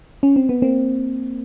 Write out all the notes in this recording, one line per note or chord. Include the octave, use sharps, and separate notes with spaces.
C#4
C4
B3
A#3 C4